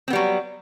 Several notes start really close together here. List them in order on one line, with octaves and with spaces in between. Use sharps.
C4 B3 G3 F#3